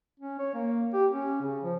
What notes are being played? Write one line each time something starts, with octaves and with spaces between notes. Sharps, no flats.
C#4
C#5
A#3
G4
C#4
C#3
F3